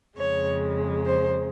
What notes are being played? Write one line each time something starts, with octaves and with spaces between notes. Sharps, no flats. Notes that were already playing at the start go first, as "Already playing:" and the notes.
F2 C#3 G#3 C#5
C5